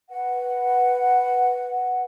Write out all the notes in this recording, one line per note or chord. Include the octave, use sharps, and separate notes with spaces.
B4 F#5